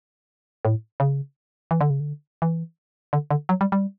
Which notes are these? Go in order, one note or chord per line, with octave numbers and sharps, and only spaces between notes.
A2
C#3
E3
D3
C#3
D3
E3
D3
D3
F#3
G3
G3